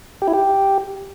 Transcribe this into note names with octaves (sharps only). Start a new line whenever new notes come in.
G4
E4
G4